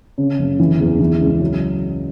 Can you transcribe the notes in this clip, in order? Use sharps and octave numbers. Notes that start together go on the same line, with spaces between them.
C#3
F#1
E3
E2
E3
C#2
F#3